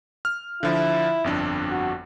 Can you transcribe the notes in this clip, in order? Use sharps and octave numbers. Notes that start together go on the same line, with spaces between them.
F6
D3 F3 E4
G1 F2 D4
F#4